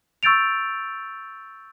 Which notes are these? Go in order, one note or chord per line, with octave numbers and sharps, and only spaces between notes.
C#6 E6 G6 A6 D7 F7